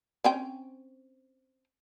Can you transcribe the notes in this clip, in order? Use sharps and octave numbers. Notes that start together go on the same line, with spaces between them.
C4 C#4 G5